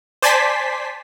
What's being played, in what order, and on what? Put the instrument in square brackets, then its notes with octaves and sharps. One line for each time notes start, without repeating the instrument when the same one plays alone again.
[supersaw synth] C5 D5 G#5 A5 C6 B6